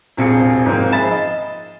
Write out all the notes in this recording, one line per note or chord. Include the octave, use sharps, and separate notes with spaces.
E1 A#1 C3 F4 G#4 C#7
G#2 F3 A#3 C4
F3 G#4 E5 B5 A6 E7
D#5